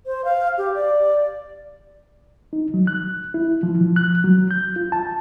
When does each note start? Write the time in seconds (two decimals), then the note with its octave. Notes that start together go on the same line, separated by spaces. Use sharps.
0.06 C5
0.25 F5
0.58 G4
0.75 D5
2.53 D#4
2.74 F#3
2.87 F#6
3.34 E4
3.63 F3
3.81 F3
3.96 F#6
4.24 F#3
4.51 G6
4.76 F4
4.92 A5